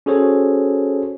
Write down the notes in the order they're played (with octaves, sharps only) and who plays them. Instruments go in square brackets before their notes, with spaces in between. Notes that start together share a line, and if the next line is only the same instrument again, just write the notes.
[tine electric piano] C#4 F#4 G#4 A4 C5 C#5